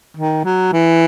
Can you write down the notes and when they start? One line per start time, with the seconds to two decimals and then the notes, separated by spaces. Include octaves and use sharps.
0.17 D#3
0.45 F#3
0.73 E3